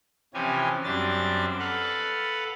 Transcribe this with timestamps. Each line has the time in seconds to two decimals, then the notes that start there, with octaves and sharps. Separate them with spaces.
0.34 C3 E3 F3 C#4 G4 G#5
0.84 F#2 G3 C4 D4 A6
1.59 A4 B4 F5 F#5